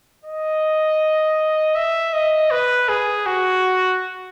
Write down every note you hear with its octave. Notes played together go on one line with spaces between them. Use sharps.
D#5
E5
D#5
B4
G#4
F#4